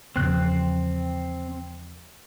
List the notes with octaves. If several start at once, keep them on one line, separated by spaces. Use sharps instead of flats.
E2 C#3 F3 C4 F#6